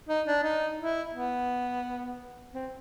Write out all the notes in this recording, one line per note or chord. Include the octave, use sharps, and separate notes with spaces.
D#4
D4
D#4
E4
B3
C4